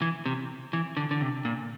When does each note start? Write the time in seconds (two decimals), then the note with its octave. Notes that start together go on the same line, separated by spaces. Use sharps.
0.02 E3
0.26 C3
0.73 E3
0.97 D3
1.11 D3
1.21 C3
1.45 A#2